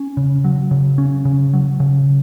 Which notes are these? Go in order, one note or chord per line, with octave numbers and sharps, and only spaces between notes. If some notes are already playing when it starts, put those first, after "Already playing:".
Already playing: C#4
C#3
F#3
C#3
C#4
C#3
F#3
C#3